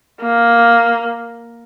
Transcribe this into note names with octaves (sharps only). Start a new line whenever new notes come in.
A#3